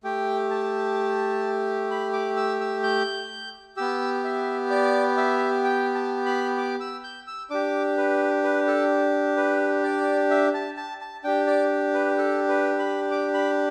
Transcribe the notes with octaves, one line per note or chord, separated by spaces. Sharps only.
A3 G4 G5
A5
B5
D6
E6
E6
G6
B3 G4 E6
E5
D5
E5
G5
A5
B5
D6
E6
G6
E6
D4 G4 D6
B4
B4
A4
B4
D5
E5
A5
A5
A5
D4 G4 G5
D5
B4
A4
B4
B5
D6
B5